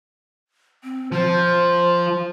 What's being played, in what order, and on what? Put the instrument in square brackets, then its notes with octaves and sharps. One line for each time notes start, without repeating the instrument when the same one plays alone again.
[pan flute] C4
[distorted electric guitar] F3 [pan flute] C5